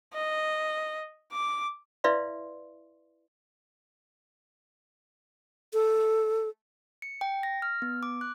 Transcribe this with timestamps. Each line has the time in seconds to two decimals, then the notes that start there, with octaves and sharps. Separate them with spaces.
0.14 D#5
1.33 D6
2.04 E4 B4 D5 E5 F5 C6
5.73 A4
7.02 C#7
7.21 G5
7.43 A#6
7.62 F6
7.82 B3
8.03 D6
8.21 F#6